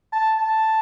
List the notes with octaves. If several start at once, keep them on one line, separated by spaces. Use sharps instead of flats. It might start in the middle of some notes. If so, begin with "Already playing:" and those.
A5
A5